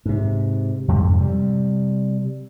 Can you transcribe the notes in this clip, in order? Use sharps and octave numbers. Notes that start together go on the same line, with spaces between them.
G#2 C3
F2 G#2 C3
C3 G3